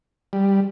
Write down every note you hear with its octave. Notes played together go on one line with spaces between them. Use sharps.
G3